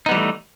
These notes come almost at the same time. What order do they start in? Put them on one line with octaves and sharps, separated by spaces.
D#4 B3 G3 E3 A3